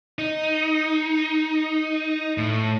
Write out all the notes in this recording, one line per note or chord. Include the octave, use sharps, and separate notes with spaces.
D#4
A2